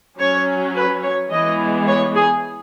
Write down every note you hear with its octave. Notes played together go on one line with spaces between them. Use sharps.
F#3 C#4 C#5
B4
C#5
E3 G#3 B3 D#5
C#5
G#4